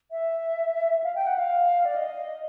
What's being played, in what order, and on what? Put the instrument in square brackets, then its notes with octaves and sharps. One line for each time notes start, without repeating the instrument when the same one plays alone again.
[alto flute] E5
F5
G5
F#5
F5
D5
D#5